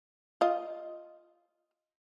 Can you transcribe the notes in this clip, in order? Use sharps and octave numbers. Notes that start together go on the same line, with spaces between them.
F4 D#5